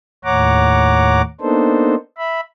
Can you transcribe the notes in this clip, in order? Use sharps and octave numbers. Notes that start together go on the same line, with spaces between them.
D#2 A2 C#5 F#5 A#5 D6
A#3 B3 D4 D#4 A4 C5
E5 B5